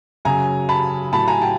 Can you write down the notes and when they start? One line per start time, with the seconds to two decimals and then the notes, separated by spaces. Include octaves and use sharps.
0.25 F#2 C#3 F#3 G#5 A#5
0.69 A5 B5
1.13 A2 F#3 A5 B5
1.28 G#5 A#5
1.42 G5 A5